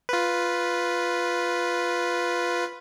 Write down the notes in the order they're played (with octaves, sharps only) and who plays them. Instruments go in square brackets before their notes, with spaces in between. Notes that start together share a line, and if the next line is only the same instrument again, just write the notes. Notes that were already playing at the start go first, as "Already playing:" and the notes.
[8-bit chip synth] F4 B4